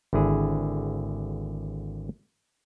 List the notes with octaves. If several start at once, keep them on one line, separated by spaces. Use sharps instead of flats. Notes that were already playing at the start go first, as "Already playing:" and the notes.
G#1 D3 E4 G#4